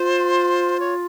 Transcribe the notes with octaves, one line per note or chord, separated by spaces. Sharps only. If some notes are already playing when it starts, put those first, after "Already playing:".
Already playing: F4 C5
C#5